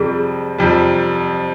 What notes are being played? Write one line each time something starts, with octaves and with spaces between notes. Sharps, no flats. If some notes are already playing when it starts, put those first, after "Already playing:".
Already playing: F2 C3 G3 G#4
F2 C3 G3